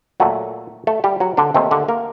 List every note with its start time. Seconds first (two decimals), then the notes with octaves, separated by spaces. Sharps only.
0.20 A#2 F#3 A3 F#4
0.87 A3 A4
1.04 G3 G4
1.20 F#3 F#4
1.37 D3 D4
1.54 D#2 D#3 A3 C4
1.71 D3 D4
1.88 A#3 A#4